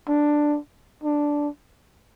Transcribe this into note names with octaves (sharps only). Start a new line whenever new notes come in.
D4
D4